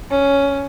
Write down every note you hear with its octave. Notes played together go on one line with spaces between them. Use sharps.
C#4